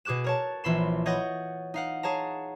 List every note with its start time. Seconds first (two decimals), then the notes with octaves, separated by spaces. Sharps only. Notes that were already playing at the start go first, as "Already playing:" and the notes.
0.05 B2 G#4 D6 F#6 E7
0.24 A#4 C#5 A5
0.64 A#1 E3 B5 C6 E7
1.06 C#5 D#5 F#5 G6 A6 A#6
1.74 D#4 F5 F#5
2.03 G#4 C#5 A5 A#5